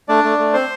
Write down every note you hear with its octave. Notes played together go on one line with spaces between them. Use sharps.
A3 D4 D5
A3
A3
C4 C5 C6